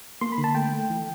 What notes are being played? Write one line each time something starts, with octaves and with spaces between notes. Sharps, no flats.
A#3 C6
B5
D3
A5
A3 G5
A3
E3